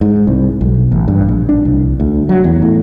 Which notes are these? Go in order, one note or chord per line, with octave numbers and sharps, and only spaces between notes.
G#2
C2
B1
A1
G2
A#1
D4
C2
D2
F#3
E2
A2